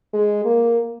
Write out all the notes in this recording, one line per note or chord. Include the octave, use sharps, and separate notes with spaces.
G#3
A#3